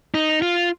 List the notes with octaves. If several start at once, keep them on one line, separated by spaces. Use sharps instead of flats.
D#4
F4